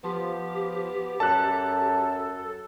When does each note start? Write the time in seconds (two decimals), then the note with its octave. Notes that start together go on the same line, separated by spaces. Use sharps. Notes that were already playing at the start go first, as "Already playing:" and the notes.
0.04 F3 B3 G4
1.20 F#2 A4 A5 F#6